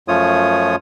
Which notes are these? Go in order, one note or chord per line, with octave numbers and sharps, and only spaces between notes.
F#2 F3 A3 F4 C#5 D#6